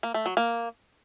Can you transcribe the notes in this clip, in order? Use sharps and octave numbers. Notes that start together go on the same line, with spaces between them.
A#3
A3
F#3
A#3